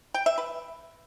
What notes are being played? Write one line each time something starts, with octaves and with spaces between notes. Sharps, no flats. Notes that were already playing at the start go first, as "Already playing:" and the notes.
G5
E5
B4